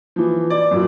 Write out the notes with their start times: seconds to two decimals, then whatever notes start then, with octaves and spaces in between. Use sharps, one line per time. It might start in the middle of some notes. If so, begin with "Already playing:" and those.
0.16 E3 F3
0.50 D5
0.71 F#2 A#2